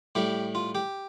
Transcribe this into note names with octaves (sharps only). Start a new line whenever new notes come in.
A2 G3 G4
F4
G4